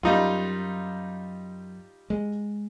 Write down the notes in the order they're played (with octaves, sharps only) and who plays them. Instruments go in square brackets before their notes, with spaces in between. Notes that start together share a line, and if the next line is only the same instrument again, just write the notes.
[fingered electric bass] F#2 [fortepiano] G3 D#4 F4
[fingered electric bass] G#3